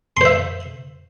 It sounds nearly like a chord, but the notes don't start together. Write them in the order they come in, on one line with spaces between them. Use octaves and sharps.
C6 C5 E5